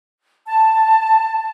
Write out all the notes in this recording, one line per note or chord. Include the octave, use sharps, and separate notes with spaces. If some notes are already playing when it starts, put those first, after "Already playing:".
A5